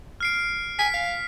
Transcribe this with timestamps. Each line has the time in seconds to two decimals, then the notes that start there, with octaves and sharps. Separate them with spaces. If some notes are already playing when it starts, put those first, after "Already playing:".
0.20 F6 C7 D7
0.79 G#5 B6
0.94 F5